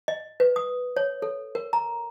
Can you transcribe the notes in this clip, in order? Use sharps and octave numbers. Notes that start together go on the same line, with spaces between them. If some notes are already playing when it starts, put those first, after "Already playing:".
D#5
B4
D#6
C#5
A4
A#4
A#5